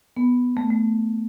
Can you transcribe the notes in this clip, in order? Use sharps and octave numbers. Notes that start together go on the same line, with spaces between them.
B3
A3
A3